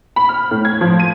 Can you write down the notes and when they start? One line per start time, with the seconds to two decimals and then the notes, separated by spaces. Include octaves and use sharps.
0.16 B5
0.29 F6
0.51 A2
0.65 G#6
0.81 F3
1.00 D#7